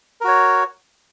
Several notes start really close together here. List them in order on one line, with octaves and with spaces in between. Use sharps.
A#4 F#4 C#5